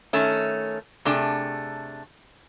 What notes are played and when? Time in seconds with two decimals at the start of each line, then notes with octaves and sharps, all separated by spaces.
0.13 D#3 A3 C#4
1.05 C3 A3 D4 G#4